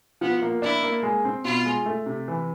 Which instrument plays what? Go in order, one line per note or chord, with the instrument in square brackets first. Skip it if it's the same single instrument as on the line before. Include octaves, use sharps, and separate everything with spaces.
[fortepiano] F3 [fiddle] B3
[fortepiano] A#3
[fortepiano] D4 [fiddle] E4
[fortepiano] A#3
G#3
C4
[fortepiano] B2 [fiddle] F4
[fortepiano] G#3
A3
C3
E3